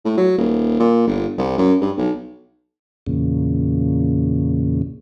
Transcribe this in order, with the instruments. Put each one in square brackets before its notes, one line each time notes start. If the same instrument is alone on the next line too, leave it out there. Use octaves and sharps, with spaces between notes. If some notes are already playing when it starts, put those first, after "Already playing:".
[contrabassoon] A2
F#3
D#1
A#2
G1
C2
F#2
G2
B1
[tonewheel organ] E2 A#2 C#3